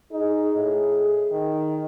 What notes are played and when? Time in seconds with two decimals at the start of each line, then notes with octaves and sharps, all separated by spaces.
0.12 D#4 G#4
0.56 A2
1.32 D#3